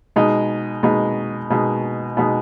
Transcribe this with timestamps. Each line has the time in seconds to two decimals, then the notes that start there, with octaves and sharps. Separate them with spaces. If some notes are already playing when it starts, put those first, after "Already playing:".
0.16 B2 G#3 D#4
0.83 B2 G#3 D#4
1.50 B2 G#3 D#4
2.17 B2 G#3 D#4